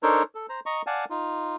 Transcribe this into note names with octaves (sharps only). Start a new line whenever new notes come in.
D4 D#4 A4 A#4 C5 C#5
A4
C5 A#5
D#5 A#5 C#6
D5 F5 F#5 G#5 A5
D#4 F4